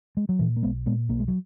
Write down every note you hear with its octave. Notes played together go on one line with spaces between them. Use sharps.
G#3
F#3
A#2 E3
A#3
B1 G#3 B3
A#2 G#3 B3
B1 A#3
G#3
F#3